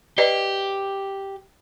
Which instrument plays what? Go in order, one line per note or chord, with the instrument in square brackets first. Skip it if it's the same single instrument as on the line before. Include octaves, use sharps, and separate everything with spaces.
[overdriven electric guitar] G4 [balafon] B4 D5 D#5